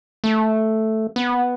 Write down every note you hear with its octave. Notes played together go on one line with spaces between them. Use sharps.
A3
B3